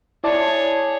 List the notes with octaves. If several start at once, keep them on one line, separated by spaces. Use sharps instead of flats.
E4 G#4 C#5 D5 A5